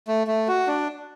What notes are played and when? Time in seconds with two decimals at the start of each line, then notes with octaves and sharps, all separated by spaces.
0.08 A3
0.27 A3
0.48 F#4
0.67 D4